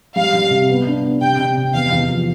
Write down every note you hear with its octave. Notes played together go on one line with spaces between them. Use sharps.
G3 F5
G3
C3
B3
D4
B3
C3 G5
C3
C3
E2 F5
E2
F3